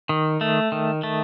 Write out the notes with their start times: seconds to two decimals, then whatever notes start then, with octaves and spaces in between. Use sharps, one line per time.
0.09 D#3
0.41 A3
0.72 D#3
1.03 A3